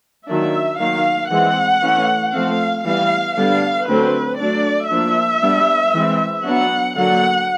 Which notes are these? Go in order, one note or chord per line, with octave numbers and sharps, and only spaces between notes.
D#3 F#3 A#3 D4 E5
D#3 F#3 A#3 F5
E3 G#3 C4 F#5
E3 A3 C#4
F3 A3 C4 F5
E3 G3 B3 F5
D3 G3 B3 D4 F5
D3 F#3 A3 C4 B4
F#3 A3 D4 D5
F3 A#3 D4 E5
G3 B3 D4
E3 G#3 C4
F#3 B3 D4 F#5
D3 F#3 A#3 D4 F#5